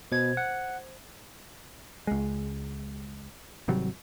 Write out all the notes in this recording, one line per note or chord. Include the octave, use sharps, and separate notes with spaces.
B2 C5 G#6
F#5
C#2 G#3
G#1 C3 F#3 G3